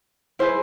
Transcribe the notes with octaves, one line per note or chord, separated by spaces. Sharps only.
E4 G#4 B4 C5